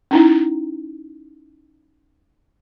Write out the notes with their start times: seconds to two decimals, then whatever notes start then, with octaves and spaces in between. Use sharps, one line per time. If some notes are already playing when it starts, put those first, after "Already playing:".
0.11 C#4 D#4 E4